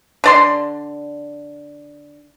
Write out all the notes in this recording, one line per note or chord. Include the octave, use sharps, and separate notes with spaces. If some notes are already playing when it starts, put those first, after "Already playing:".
D3 D5 C6